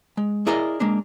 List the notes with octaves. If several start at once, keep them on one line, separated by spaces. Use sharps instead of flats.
G#3
E4 G#4 A#4 D5 D#5
G#3 A#3 D4